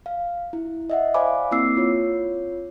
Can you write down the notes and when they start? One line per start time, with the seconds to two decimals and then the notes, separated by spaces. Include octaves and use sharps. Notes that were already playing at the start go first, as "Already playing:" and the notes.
0.06 F5
0.53 E4
0.90 D#5 E5 F#5
1.14 C5 D5 F5 G#5 B5 D6
1.51 A#3 C4 E4 D6 E6 C7
1.77 F4 C#5